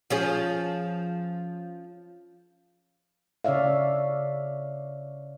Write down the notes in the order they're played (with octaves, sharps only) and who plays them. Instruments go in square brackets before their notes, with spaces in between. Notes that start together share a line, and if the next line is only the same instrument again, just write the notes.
[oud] F3 C#4 G#4
[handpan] C#3 C#5 D5 E5 F5